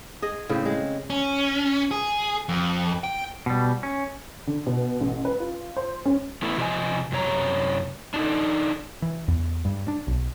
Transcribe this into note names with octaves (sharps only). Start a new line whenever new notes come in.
G#4 D#5
A2 C#3 C4
G#3
C#4
G#4
F2
G5
B2 G3
C#4
D3
B2
A1
B4
F4
C5
C#4
E3 A3 B3 E4
C3 F3 F#4 A#4 D#5 G#5
F#2 C3 C#5 A#5
D4 D#4 A4
E3
E2
G2
D4
B1